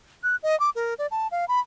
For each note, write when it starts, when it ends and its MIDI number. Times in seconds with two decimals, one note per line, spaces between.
0.23 0.36 90
0.43 0.58 75
0.60 0.70 86
0.75 0.94 70
0.99 1.07 74
1.11 1.27 81
1.31 1.45 77
1.48 1.60 83